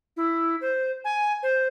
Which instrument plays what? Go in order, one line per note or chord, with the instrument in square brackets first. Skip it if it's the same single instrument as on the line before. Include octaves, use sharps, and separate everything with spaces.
[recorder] E4
C5
G#5
C5